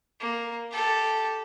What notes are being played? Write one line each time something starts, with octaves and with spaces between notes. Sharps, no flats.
A#3
G4 A4